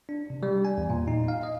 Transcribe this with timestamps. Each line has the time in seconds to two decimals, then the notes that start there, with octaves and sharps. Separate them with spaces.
0.09 D4
0.30 C3
0.43 G3
0.65 G#5
0.78 E2
0.90 A#2
1.08 D#4
1.28 F5
1.43 D#5